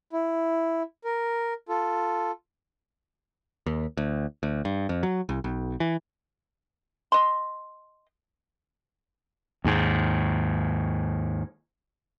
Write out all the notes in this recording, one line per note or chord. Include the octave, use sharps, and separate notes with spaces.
E4
A#4
F4 A4
D#2
D2
D2
G2
F2
F#3
C2
B1
E3
D#5 C6
D#2 G#2